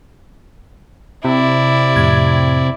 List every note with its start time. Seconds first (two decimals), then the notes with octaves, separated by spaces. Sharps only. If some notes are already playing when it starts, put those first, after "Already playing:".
1.25 C3 E4 D5
1.96 F2 A2 G#6